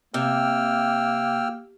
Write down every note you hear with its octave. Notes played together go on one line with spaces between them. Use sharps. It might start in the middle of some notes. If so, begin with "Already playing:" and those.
C3 A#3 G5 E6 F6